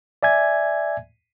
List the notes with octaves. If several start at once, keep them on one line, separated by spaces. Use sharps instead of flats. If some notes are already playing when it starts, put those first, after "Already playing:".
D5 E5 G#5 G#6